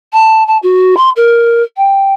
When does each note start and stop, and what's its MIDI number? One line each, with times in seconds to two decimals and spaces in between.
0.13 0.46 81
0.47 0.58 81
0.63 0.95 66
0.97 1.10 84
1.16 1.62 70
1.77 2.14 79